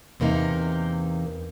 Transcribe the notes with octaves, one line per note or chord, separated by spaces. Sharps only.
E2 C3 A#3 D#4